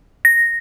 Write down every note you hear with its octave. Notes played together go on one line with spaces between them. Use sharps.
A#6